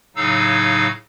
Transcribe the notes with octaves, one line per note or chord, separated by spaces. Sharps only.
A2 C#3 F#3 D#4 F5 E6